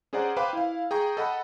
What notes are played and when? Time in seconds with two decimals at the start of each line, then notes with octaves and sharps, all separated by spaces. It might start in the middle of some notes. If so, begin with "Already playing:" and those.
0.13 C#4 G#4 C5 D5 F#5 A#5
0.37 B4 C5 F5 G5 B5 D6
0.53 E4 F5
0.91 G#4 G5 A#5 C#6
1.17 A4 D#5 F#5 B5